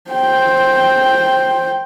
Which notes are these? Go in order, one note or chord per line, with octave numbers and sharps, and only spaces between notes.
C5 G5